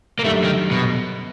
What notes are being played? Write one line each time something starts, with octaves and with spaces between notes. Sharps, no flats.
A#3
F#2 D3 G3 A3
D#3
B2